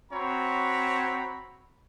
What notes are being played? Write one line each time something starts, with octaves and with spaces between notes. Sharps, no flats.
C4 F#4 C#5 A#5 B5